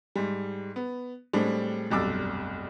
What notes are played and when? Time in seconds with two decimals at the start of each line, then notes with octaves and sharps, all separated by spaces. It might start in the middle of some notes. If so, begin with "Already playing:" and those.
0.16 G#2 G3
0.76 B3
1.33 A2 G3 G#3 C4 D4
1.90 F1 B1 G2 D6 E6 A6